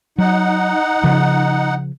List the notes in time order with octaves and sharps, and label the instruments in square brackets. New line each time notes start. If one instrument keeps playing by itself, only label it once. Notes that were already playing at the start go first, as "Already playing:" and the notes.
[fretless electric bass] F#3 [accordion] D#4 F#5
[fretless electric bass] C#3 F3